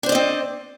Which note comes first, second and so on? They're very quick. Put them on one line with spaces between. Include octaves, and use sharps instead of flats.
D4 C5 D5 D#5 C4